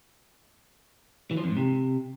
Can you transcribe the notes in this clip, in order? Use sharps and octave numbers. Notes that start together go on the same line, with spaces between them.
E3
F3
F2
G#2
C3